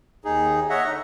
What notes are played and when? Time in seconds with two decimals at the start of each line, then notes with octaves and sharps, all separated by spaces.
0.25 D#2 D#4 G#4
0.70 C#5 D#5 E5 F#5
0.87 D3 D#4